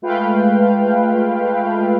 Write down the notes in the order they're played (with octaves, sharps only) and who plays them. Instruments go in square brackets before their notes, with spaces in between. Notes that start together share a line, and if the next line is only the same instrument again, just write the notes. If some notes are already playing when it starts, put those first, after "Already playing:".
[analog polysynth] G#3 A3 F4 B4 F5 G5